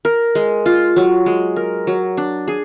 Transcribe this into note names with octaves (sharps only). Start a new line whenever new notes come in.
A#4
G#3
F4
F#3
G#3
A#4
F#3
D4
G#4